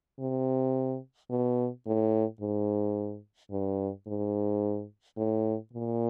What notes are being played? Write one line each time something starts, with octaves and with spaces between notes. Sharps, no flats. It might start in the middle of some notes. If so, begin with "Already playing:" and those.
C3
B2
A2
G#2
G2
G#2
A2
A#2